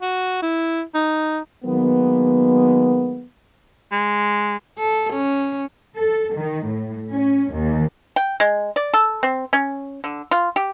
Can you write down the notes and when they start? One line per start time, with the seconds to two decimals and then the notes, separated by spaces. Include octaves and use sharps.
0.02 F#4
0.42 E4
0.95 D#4
1.65 D#3 F#3 G#3 A#3 B3
3.92 G#3
4.78 A4
5.14 C#4
5.96 A4
6.34 D#3
6.65 A2
7.11 C#4
7.52 D#2
8.16 G5
8.40 G#3
8.76 D5
8.94 A4
9.23 C4
9.53 C#4
10.04 D3
10.31 F4
10.56 G4